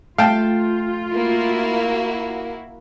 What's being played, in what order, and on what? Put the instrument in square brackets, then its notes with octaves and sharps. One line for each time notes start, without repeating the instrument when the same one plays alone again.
[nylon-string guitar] A3 [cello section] F4 [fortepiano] F5 G5 A5
[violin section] A#3 E4 F#4